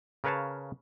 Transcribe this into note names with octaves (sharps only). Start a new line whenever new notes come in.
C#3 A#4 B4 C#5 F5 A5